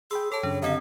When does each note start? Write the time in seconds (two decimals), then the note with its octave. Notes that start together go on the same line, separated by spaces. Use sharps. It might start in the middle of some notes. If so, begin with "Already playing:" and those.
0.11 G#4 G5 B5 C6 E6
0.32 A4 C#5 A5
0.43 F#2 C#3 D4
0.62 D3 C4 D#5 F#5